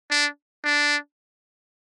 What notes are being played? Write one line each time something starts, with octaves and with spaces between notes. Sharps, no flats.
D4
D4